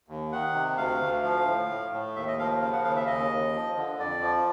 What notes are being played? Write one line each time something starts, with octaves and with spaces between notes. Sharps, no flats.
D#2
D#3 F#5
C3
D2 F5
D2
F3 F5
A2
A2
A2
D#2 E5
D#5
F3 F5
C#3 F5
F#5
D#2 F5
E5
D#2 D#5
D#2
F3
D3
F2 D5
F3